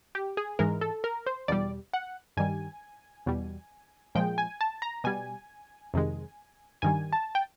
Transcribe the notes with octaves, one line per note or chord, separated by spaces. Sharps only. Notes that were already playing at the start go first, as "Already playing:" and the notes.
G4
G#4
G#2 E3 G#3 A#4
A4
A#4
C5
E2 B2 G3 D5
F#5
G2 D#3 G3 G#5
E2 B2 G3
A#2 F3 G#3 G5
G#5
A5
A#5
B2 G3 G#5
F2 C3 D#3 G#3
G2 D#3 G3 G#5
A5
G5